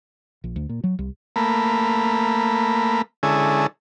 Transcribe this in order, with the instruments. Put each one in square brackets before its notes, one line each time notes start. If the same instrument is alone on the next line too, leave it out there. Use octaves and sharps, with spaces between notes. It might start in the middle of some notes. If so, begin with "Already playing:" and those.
[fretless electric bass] A#1
D2
A#2
F#3
C2
[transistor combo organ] A3 A#3 B5
D3 G#3 C#4 E4 G#4 A4